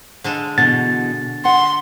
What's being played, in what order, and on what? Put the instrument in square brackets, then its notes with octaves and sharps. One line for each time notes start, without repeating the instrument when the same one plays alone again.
[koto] D3 G#3 A4
[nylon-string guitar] B2 E3 [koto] D3 [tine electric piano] A6
[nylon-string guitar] F#5 [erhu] C6